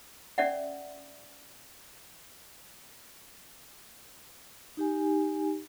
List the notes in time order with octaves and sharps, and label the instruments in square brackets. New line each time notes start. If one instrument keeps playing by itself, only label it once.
[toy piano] C#4 D5 E5 F#5
[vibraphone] D#4 G4 G#5